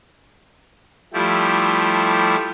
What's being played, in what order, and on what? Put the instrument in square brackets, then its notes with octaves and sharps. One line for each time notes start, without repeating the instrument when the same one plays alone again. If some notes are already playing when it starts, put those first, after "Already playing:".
[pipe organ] F3 G3 A3 E4 G4